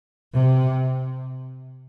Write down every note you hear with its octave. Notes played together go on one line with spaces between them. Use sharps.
C3